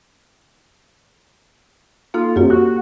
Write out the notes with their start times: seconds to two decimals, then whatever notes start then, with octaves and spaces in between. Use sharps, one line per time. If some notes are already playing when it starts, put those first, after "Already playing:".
2.14 A#3 D#4 F4 A4
2.36 F#2 A#3 F4 G4
2.50 F#4